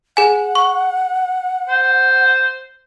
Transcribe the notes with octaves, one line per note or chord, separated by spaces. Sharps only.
G#4 F#5 G#5
C#6
C5